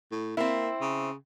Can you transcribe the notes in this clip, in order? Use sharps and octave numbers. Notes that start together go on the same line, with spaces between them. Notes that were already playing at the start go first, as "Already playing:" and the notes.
A2
A#3 C4 E4
C#3